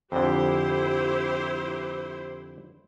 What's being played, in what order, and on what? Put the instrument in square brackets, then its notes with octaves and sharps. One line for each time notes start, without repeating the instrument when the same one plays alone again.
[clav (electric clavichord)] F2 D3 [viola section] E4 G4 C5